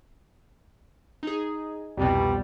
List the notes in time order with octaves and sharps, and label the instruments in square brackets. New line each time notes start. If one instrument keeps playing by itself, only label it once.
[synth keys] D#4 G#4
[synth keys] C2 F2 B2 [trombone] G3